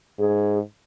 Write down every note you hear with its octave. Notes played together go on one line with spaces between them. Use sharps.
G#2 G#4